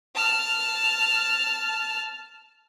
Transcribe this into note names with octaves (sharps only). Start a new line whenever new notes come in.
A5 F6